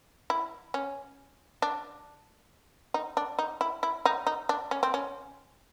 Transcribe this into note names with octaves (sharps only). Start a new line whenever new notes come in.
E4
C#4
D4
D#4
D4
D#4
E4
E4
D#4
D#4
D4
C#4
C4
C#4